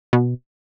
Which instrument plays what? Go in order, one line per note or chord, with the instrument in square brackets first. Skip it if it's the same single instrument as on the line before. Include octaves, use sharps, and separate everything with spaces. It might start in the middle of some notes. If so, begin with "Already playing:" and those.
[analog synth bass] B2